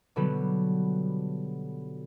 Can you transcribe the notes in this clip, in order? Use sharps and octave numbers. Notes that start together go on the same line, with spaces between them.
B2 D3 F#3 G3 B3